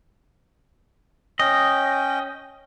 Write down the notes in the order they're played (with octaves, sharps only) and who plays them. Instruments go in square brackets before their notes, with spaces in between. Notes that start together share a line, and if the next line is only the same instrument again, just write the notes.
[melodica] C#4 G5 [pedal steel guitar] D#5